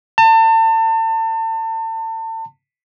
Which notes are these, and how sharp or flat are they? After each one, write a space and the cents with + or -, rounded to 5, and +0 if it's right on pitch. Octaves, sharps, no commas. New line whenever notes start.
A5 +35